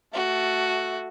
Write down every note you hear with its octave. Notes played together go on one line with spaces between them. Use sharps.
A3 F#4